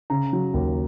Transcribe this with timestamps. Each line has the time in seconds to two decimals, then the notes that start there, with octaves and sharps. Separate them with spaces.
0.10 C#3 A#5
0.33 F#3
0.54 D#2